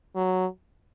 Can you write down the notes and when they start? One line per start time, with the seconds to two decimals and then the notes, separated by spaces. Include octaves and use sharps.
0.16 F#3